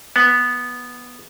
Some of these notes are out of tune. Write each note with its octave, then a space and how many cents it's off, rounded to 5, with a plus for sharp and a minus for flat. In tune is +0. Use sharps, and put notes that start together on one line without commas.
B3 -5